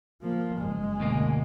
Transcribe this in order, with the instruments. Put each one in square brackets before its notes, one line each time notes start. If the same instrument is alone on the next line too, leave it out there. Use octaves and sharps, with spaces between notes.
[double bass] F3 A#3
F#1 G#3
[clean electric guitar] D2 B2 A#3